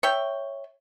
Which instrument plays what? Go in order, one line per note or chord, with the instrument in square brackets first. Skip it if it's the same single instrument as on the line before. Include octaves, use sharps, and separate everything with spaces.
[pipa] C#5 E5 G5